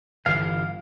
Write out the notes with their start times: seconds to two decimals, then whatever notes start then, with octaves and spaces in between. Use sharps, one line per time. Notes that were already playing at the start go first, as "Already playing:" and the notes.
0.26 G1 D3 E3 F5